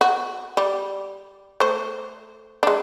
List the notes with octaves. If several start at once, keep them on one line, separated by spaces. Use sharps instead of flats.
F#4
G3
A3 C5
G#3 D4